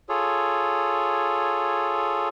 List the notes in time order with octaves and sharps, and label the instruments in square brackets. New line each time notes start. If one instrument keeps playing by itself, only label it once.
[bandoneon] F4 G#4 A4 C#5